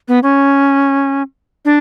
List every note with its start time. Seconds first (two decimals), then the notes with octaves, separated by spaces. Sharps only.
0.08 B3
0.23 C#4
1.65 D4